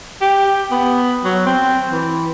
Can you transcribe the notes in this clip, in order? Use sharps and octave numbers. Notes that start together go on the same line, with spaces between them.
G4
B3
F#3
C4
E3